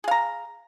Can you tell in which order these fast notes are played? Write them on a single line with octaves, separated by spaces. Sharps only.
G#4 F5 A#5